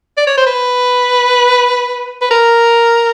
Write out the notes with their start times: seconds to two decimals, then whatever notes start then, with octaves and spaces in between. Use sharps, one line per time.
0.17 D5
0.27 C#5
0.37 C5
0.46 B4
2.21 B4
2.31 A#4